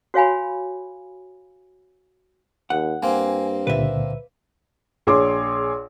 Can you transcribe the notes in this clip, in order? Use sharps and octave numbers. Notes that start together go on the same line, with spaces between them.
F#4 C#5 F5 G#5 B5
D#2 F#5
G2 A#3 C4 G#5
C#2 A#2 D3 B4 E5
A#1 G#4 C#5 C6 D6